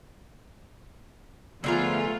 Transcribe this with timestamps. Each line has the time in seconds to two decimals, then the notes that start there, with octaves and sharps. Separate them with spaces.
1.64 D3 F3 A3 B3 F4 G#4 A#5